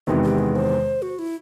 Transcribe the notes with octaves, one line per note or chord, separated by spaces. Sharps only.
E2 C3 D#3 G#3 B3 F#4
G4
G#4
C5
F#4
E4